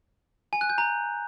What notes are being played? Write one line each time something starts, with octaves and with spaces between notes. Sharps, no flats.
G#5
F#6
G6
A#5